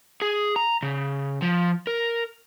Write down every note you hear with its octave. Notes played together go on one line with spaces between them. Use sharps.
G#4
A#5
C#3
F3
A#4